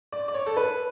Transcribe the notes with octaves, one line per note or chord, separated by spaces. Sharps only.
D5
D5
C#5
A4
B4